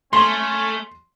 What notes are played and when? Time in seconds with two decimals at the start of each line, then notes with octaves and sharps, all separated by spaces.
0.13 A3 C#4 C6